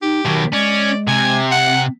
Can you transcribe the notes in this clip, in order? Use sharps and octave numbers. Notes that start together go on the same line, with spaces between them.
D#4 G4
B2 D#3 F#3
G#3 C#4 D5
C3 G#5
C4 F#5